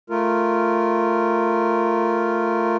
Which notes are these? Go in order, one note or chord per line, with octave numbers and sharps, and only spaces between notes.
A3 F4 A#4